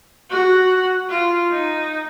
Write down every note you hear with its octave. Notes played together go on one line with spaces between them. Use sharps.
F#4
F4
D#4